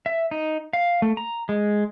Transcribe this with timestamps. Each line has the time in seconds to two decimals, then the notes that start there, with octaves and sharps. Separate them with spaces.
0.06 E5
0.31 D#4
0.73 F5
1.02 A3
1.17 A#5
1.49 G#3